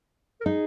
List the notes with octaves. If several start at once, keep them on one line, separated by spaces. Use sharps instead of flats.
A#4
D#4 G#4